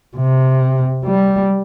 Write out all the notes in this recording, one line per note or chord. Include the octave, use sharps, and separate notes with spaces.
C3
G3